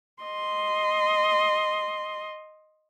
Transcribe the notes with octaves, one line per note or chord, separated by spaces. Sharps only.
D#5 C6